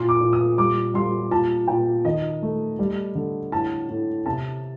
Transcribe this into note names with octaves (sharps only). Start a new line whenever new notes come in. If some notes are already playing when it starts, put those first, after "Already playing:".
Already playing: A#2 C6
D6
A#2
D#6
G3 D6
G3 C6
A#2 A5
A#2 G5
D#3 D#5
A3
G3
D3
A2 A5
A2
C3 A5